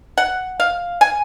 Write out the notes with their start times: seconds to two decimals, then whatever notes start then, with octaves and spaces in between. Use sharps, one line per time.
0.18 F#5
0.60 F5
1.01 G#5